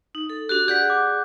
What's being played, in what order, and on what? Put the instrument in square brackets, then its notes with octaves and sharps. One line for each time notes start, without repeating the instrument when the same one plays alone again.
[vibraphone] D#4
A4
[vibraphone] D4 F#4 G4 [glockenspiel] F#6
[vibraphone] G#4 D5 F#5 [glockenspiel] G6 B6
[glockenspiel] D6